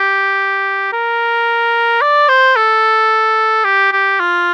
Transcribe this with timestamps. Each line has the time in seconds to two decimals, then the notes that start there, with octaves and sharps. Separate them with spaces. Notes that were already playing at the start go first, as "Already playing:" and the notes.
Already playing: G4
0.93 A#4
2.02 D5
2.28 C5
2.56 A4
3.65 G4
3.92 G4
4.20 F4